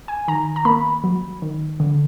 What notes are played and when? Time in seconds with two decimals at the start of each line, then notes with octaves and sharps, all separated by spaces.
0.08 G#5
0.28 D#3 A#5
0.56 A#5
0.65 A#3 B5
1.04 F#3
1.42 D#3
1.80 D3